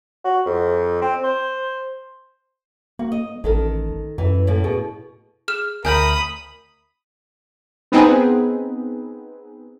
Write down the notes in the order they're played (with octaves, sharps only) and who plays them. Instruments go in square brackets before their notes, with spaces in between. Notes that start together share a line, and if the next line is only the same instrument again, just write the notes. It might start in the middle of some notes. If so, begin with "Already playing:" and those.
[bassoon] F#4
F2
C4
C5
[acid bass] A#3 [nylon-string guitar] F#4
[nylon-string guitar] D#5
[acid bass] A1 [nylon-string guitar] D#3 A4 A#4
[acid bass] F#2 [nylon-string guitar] E3
[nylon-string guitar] A2 C#3 A#3
[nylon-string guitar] B2 [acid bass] G#4
[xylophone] G#4 F6 E7
[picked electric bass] D2 [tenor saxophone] A#4 [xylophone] G#5 G6 [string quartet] B5 D#6
[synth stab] B3 C4 D#4 G#4 B4